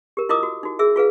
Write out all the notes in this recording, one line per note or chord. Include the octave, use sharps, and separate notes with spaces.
G4 A#4
E4 F4 A#4 D#5 D6 D#6
F#4
D#4 F#4
G#4 E5 E6
F4 G#4 B4 F5